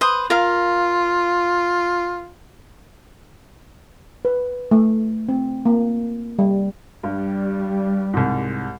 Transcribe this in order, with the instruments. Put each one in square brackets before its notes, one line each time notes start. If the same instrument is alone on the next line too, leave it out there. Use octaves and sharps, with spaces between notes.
[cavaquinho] B4 C5 D#6
[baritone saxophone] F4 [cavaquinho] A#4 F5
[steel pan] B4
A3
C4
A#3
G3
[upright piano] G2 [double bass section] G3
[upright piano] C2 G#2